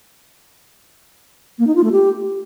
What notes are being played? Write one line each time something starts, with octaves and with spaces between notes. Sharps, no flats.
A#3
D#4
F4
A3
G4